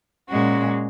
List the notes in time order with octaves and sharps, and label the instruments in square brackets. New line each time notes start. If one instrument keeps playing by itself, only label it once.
[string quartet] A#2 G#3 C#4 F#4